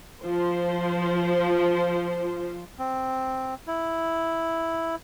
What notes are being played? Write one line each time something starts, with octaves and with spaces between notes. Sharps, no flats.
F3 C5
C4
E4